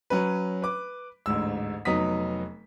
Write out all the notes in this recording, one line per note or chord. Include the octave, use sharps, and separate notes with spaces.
F#3 C#4 B4
B4 D6
A1 D2 G#2 E6
F1 F#3 B3 D#4 D#6 B6